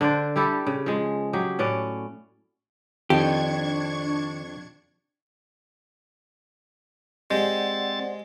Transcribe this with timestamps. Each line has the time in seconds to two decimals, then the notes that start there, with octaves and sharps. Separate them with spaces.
0.01 D3 D4 C5 D5
0.36 G3 E4 G4 A4
0.67 C#3
0.86 F3 G#3
1.33 F#3 G4 G#4
1.59 A2 C#4 D5 F#5
3.10 F2 D#3 C4 D4 G4 C#6 G#6
7.30 G#3 C4 G4 C5 D5 F#5 A6